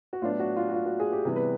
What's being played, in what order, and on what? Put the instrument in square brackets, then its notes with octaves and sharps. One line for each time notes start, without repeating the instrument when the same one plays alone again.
[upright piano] F#4
A2 F#3 B3 D4 F4
F#4
F4
F#4
F4
F#4
G#4
G4
C3 E3 G3 B3 G#4
B4